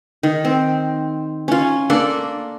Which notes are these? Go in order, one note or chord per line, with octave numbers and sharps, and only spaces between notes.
D#3
C4
C#4 F4
A#3 D4 A4